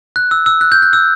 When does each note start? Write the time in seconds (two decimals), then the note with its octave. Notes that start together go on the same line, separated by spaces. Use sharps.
0.16 F#6
0.31 E6
0.46 E6
0.61 F#6
0.72 G6
0.82 F#6
0.93 E6